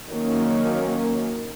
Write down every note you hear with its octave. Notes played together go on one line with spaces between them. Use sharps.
D#3 F#3 A#3 C#4